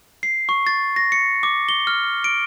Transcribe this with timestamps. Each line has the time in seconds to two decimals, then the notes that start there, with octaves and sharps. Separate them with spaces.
0.23 C7
0.49 C#6
0.67 A6
0.96 A#6
1.12 C#7
1.43 D6
1.69 G7
1.87 F6
2.24 D7